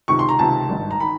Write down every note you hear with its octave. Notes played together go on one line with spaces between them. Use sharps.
C#2 C3 D#3 C#6
C6
A#5
C#2 C3 D#3 A5
G#1 G2 D#3
A#5
D#3 B5